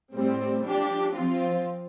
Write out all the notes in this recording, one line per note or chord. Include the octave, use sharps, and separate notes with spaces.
A2 G3 C4
F3 D4 G4
F3 C4 F4